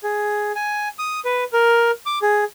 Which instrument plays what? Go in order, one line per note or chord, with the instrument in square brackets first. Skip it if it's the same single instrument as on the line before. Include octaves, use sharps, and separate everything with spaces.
[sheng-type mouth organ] G#4
G#5
D#6
B4
A#4
D6
G#4